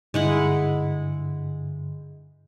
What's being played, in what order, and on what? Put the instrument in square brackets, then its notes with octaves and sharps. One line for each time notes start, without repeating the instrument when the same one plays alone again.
[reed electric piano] G2 D3 [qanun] G#3 E4 F#5